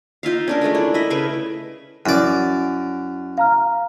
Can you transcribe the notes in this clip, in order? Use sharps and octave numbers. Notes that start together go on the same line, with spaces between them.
D#4 F4 E5 F5
C#4 D4 A#4
G#3 A3 A4 A#4
D4 E4
E4 D#5 E5
C#3 B4 B5 C#6
F#2 E4 D5
F5 A#5 F6